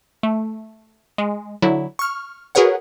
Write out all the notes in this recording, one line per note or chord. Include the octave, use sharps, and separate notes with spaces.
A3
G#3
D3 F#3 E4
C#6 F6
F#4 G#4 A#4 B4 C#5 F#5